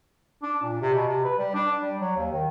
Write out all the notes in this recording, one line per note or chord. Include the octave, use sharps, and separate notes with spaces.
D4
A#2
C3
B2
C3
B4
G3
D4
G3
F#3
D#2
D#3